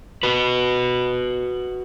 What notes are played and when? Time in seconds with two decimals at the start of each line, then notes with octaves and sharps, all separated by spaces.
0.23 F#4 B4